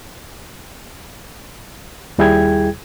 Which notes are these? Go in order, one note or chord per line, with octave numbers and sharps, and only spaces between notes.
D#2 G3 E4 G#4 G5 G#6